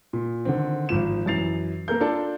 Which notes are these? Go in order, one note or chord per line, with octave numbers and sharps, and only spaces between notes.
A#2
D3 D#3 C4
G#1 F3 E7
F#2 E3 A6 C7 F7
A#3 A4 A#4 G6
D4 F4 A4 D5 A5